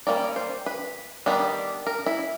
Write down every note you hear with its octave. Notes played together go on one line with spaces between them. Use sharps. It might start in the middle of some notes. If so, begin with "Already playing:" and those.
D#3 G3 A#3 C#4 D5
C5
B4
D#3 G3 B3 D4
A#4
E4